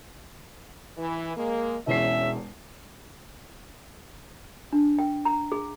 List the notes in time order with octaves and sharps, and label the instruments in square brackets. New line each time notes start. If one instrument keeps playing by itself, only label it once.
[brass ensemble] E3
G#3 A#3
[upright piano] E1 E2 C7 [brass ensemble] C#4 E5
[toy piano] D4
G5
A#5
G#4